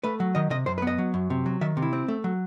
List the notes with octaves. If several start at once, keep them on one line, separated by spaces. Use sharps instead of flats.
A3 B4
F#3
D#3 D#5
C3 D#5
F#2 C5
B4
B3 D#5
F#3
F#2
C3
F#3
D#3 E5
C3
E4
C4
A3
F#3